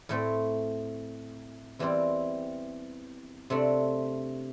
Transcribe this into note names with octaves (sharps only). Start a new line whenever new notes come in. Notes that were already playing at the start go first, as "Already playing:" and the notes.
A2 A3 C4
E2 E3 G3 C4 E4
C3 A3 D4